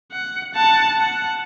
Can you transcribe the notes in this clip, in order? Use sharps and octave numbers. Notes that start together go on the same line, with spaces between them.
F#5
F#5 A5
F#5